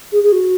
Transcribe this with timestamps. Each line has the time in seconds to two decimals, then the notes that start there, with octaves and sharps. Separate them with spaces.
0.12 G#4
0.24 G#4
0.32 F#4